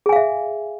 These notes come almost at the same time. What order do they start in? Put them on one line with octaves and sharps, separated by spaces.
G#4 G#5 F5 E5